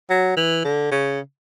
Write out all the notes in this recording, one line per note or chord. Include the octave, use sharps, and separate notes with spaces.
F#3
E3
D3
C#3